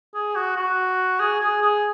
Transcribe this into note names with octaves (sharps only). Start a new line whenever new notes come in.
G#4
F#4
F#4
G#4
G#4
G#4